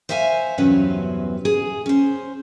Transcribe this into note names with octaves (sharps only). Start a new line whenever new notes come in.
C5 C#5 E5 F5 G#5
E2 G2 C3 F#3 C#4 B4
G#4
C#4 C5